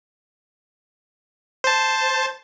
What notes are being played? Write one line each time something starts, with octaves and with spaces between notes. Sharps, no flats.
C5 A5